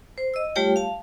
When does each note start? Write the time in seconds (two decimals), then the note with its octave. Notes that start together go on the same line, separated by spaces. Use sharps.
0.18 C5
0.34 D#5 E6
0.56 G3 A3 F4 G4 C#5 G5
0.76 F5 A5